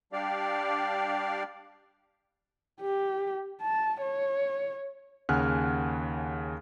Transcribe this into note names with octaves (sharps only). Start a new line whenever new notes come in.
G3 D4 G4 D5 F5
G4
A5
C#5
D#2 C#3 F#5 G#5 F6 F#6